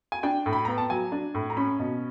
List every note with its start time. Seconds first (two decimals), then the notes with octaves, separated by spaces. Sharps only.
0.12 G#5
0.23 D4 G5
0.46 A2
0.53 B5
0.65 B3 A#5
0.78 A5
0.90 F#3 G#5
1.12 D4
1.35 A2
1.50 A#5
1.57 C#4 B5
1.79 B2